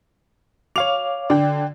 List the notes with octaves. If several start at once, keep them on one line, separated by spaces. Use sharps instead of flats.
C#5 F5 D6 F7
D3 D5 G5